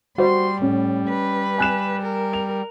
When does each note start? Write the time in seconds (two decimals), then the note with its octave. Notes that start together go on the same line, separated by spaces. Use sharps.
0.18 G3 F#4 C5 C6
0.62 A2 C#4
1.08 B4
1.58 G#5 F#6 E7
2.02 A#4
2.33 F7